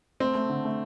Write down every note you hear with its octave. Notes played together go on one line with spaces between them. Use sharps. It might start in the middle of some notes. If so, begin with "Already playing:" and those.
A3 C4
A3
D3
A3